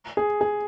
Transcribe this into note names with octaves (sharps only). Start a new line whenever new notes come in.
G#4
G#4